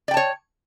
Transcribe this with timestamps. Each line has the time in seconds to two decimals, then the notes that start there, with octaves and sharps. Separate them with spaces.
0.08 D5
0.11 G5
0.14 A5
0.17 C#5